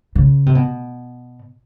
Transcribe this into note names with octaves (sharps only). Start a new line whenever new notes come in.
C#3
C3
B2